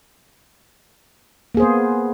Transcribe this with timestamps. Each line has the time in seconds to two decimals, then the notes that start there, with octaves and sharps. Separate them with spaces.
1.55 A#3
1.57 G#4
1.60 C5
1.62 B3